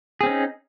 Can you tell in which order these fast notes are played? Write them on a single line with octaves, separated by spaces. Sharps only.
G#4 C4 C#4 D#4